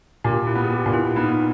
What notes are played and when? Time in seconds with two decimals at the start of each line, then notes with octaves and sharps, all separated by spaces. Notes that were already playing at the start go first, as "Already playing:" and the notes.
0.24 A#2 G4
0.47 E4
0.55 B3
0.64 G#4
0.70 G4
0.86 A#2
0.93 E4
1.16 B3 D#4